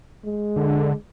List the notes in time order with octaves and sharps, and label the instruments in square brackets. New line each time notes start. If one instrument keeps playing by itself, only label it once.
[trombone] G#3
[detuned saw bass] D3